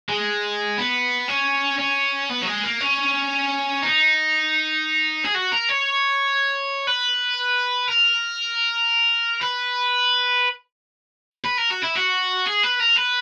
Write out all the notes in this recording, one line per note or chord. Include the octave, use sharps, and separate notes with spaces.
G#3
B3
C#4
C#4
B3
F#3
G#3
A#3
C#4
D#4
G#4
F#4
A#4
C#5
B4
A#4
B4
B4
A#4
F#4
E4
F#4
G#4
B4
A#4
B4